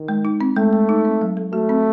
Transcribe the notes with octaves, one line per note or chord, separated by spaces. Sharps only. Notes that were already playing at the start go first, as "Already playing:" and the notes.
Already playing: D#3
G#3
D#4
C4
G#3 A3
G#3
D#4
C4
F#3
A4
A3 F#4
C4